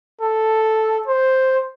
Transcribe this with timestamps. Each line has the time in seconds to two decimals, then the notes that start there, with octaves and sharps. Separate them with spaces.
0.21 A4
1.08 C5